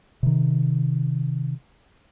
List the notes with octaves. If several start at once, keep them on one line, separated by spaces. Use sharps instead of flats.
C3 D#3